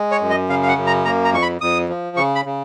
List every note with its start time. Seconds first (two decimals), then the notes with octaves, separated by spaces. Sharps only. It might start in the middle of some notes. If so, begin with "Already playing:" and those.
Already playing: G#3
0.11 C#5
0.21 F#2
0.30 D#5
0.49 C#3 F5
0.62 F5
0.68 F#5
0.77 F#2
0.87 A#5
1.05 A#3 A#5
1.24 A#5
1.33 F2 C#6
1.42 B5
1.61 F2 D#6
1.89 F3
2.17 C#3 C#6
2.35 B5
2.46 C#3